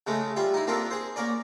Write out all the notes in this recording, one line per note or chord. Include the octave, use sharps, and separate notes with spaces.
C#3 G#3 A3
G3 F4 E5
D#4 E4
A#3 C4 D4 F4 A4 A#4
G#4 C5
A#3 C#4 A#4 D5